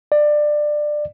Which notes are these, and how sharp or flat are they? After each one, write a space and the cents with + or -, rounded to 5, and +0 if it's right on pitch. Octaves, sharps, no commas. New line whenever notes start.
D5 +20